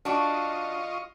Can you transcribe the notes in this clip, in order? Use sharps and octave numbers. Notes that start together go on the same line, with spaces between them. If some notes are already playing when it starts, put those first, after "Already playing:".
D4 F4 F#4 D#5 C#6